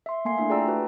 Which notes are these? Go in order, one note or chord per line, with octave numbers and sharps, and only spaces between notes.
E5 C6
A3 A#3 G#5 C6 C7
A3 D4 E4 E5
F4 G#4 D5 G5 A#5 E6
F#4 B4 A5